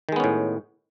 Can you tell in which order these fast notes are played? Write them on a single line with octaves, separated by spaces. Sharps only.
D#3 G#3 B3 C#4 A2